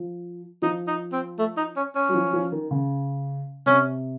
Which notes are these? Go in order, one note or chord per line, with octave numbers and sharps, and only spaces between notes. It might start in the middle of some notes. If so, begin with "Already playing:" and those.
Already playing: F3
F3 D#4
D#4
C4
A3
D#4
C#4
C#4
F#3
F3
F3
D#3
C#3
C3 C#4